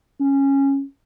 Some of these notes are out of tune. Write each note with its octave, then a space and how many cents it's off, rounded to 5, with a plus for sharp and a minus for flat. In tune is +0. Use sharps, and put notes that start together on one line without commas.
C#4 -10